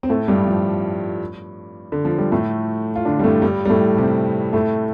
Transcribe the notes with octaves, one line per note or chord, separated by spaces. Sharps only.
C4
A2 A3
G2 G3
F3
D3
F3
G3
A2 A3
F4
D3 D4
G3
A2 A3
G2 G3
G3
A2 A3
C3 C4
A2 A3